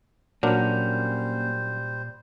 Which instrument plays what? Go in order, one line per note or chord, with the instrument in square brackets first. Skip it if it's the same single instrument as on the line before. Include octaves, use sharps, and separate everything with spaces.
[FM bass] A#2 [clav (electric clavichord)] F#3 D4 [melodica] G3 C5 [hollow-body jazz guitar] A#3 C#4